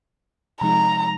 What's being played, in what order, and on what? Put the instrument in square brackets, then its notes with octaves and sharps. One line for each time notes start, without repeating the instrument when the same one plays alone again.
[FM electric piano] C3 F3 G#3 D#4 [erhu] A#5